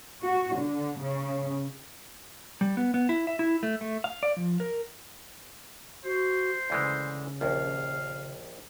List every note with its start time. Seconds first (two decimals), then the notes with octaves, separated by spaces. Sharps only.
0.22 F#4
0.57 D3
0.99 C#3
2.61 G3
2.77 B3
2.94 B3
3.09 E4
3.27 E5
3.39 E4
3.63 A3
3.81 A3
4.04 F5
4.23 D5
4.37 F3
4.60 A#4
6.05 F#4 C5
6.70 D2 C#3 E3 G#3
7.41 A#1 D#2 F5